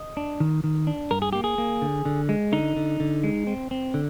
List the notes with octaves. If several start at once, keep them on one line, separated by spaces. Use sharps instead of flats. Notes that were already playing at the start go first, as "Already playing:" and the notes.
Already playing: D#5
D4
D#3
D#3
D4
G2 A#4
G#4
A#3 G4
G#4
A#3
D3
D3
G#3
D3 D#4
D3
D3
G#3
C4
C4
D3